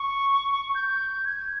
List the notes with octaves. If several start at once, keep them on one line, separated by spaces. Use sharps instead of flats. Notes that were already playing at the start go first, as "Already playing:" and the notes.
Already playing: C#6
G6
G#6